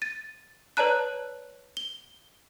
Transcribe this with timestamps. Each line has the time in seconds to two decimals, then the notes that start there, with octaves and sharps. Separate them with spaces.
0.02 A6 D#7
0.77 B4 C#5 D5 A5 A#5 F#6
1.77 G7